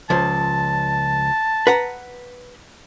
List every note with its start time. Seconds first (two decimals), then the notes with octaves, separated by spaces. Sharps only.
0.10 C#2 F3 A5
1.67 B4 F#5 A#5